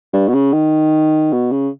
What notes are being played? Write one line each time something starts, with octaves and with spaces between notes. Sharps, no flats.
G2
B2
C#3
D#3
B2
C#3